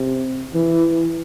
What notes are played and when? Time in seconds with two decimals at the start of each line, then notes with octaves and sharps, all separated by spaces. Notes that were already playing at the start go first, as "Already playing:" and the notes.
Already playing: C3
0.54 E3